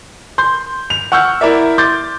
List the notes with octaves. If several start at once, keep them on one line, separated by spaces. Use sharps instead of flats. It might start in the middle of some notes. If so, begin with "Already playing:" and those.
C6 G6
F7
F#5 C#6 E6 F6 G6
E4 A#4 D5 E5
C6 D6 G6 A6